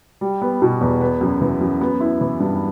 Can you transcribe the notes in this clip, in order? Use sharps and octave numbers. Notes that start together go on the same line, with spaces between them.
G3
B3
B2
E2
B3
F#2
E3
F#2
B3
E4
E3
G2